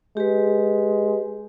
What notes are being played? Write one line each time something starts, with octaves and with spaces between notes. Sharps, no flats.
G#3 G4 B4